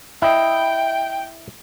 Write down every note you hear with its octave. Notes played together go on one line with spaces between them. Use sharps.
E4 D#5 G5